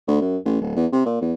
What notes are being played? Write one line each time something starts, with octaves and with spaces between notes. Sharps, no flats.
D2
F#2
A1
D1
E2
C3
A#2
E2